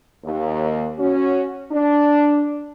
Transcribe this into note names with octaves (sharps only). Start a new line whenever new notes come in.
D#2
C#4 F#4
D4